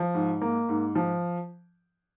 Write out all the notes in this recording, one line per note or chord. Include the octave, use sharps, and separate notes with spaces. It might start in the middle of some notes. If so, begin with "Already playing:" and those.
Already playing: F3
G#2
A#3
G#2
F3